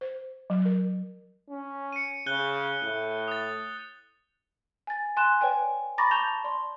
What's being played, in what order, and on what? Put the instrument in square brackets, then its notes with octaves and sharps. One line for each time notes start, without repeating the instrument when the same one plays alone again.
[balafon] C5
F#3
A#4
[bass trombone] C#4
[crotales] C#7 D#7
[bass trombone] C#3 [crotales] F#6 G6 G7
[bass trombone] A2
[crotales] D#6 A6
[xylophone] G#5 A6
G#5 C6 F#6 E7
B4 C#5 D5 G5 G#5
A#5 B5 C#6 D6 A6 A#6
A5 C#6 G6 F7 G7
D5 C6